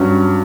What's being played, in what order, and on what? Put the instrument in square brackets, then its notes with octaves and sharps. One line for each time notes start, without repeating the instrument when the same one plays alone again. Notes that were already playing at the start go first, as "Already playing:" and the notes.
Already playing: [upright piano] G2 F#3 C#4